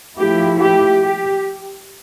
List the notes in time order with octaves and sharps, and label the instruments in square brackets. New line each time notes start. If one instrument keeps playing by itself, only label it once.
[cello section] F3 A3 E4 G4
G4
G4